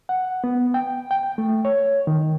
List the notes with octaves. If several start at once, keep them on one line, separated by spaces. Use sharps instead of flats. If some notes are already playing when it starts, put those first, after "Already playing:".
F#5
B3
G5
G5
A3
C#5
D#3